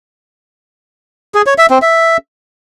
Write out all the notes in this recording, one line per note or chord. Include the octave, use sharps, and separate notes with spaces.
G#4
C#5
E5
C4
E5